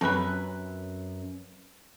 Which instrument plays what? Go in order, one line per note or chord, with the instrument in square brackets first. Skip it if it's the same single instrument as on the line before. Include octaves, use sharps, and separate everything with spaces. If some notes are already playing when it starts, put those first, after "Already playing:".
[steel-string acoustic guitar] F#2 [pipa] C3 C#4 B4 [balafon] C4 B5